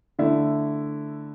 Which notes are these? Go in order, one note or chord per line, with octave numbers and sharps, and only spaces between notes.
D3 A3 E4